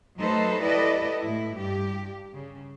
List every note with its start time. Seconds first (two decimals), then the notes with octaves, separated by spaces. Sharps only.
0.19 F#3 A3 D#4 A4 B4 C5
0.63 E4 G4 A4 B4 D5 D#5
1.21 A2 E4
1.58 G2 G4
2.35 C#3